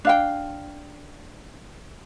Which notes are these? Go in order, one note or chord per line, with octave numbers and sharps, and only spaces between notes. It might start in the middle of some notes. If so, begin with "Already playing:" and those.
D4 F5 G5